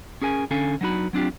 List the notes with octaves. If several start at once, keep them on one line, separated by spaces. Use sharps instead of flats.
C#4 G#4 A#4 G#5
D3 C#4 A4 F5 G#5
F#3 B3 D4 D#4 F#4 B5
F#3 C4 D4 F4 G4